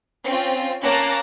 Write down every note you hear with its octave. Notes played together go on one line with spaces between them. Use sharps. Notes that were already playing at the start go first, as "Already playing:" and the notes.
C4 C#4 F4
A#3 C#4 A5 D6 F#6 A#6